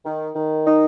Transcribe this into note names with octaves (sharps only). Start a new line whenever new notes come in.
D#3
D#3
D#4